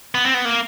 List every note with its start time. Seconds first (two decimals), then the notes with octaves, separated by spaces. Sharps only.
0.15 B3
0.25 C4
0.34 B3
0.45 A#3